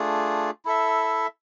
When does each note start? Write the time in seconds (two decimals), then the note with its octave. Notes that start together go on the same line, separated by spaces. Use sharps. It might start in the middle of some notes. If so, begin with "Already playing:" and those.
Already playing: A3 D4 F4 G#4
0.65 E4 A4 E5